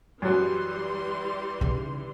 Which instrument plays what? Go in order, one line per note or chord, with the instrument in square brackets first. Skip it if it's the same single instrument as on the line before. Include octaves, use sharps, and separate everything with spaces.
[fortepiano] F#2 F#3 [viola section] E3 G3 C6
[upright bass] C#3 D#4